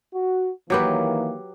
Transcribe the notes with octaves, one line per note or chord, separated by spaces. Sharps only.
F#4
D#3 E3 F#3 A#3 G4 B4